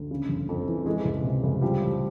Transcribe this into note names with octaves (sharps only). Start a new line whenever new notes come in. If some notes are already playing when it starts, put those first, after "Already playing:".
Already playing: D2
C#3
G1
F2
E3
E3 G#3 G#4
C#2
C3
C#2
F3 G3 G4
A1